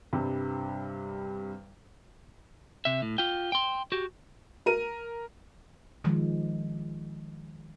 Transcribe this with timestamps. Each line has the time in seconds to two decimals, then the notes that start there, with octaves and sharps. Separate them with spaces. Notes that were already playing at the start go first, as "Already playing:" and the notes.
0.13 G2 C3 G3
2.85 C3 E5
3.02 A2
3.18 F4 G5
3.52 G5 C6
3.92 F#4 G4
4.66 A#4 D#7
6.04 D#3 F3 G#3